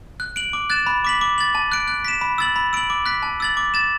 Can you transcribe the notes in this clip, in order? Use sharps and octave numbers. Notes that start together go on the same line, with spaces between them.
F#6
D7 F#7
D6
F#6 A6 E7
B5
D6 B6 F#7
D6
A6 F#7
A5
F#6 D7
F#6
B6 E7
B5
E6 A6 F#7
B5
E6 D7 F#7
D6
F#6 B6
A5
E6 A6 F#7
D6
A6 E7